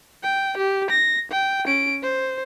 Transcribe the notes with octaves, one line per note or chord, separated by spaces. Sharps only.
G5
G4
A#6
G5
C#4 D7
C5